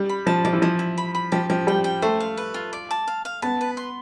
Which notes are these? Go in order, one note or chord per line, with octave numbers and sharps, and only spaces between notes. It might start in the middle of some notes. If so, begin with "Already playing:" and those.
Already playing: G3
B5
F3 A5
F3 D5
E3
F3 E4
E4
B5
B5
F3 G4
F3 G4
G3 G5
G5
A3 C5
F5
B4
F4
D5
A5
F5
F5
B3 A5
B4
C6